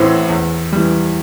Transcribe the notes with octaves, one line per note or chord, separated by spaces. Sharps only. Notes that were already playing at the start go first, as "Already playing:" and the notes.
Already playing: A1 A2 E3 C4
E2
E3 G3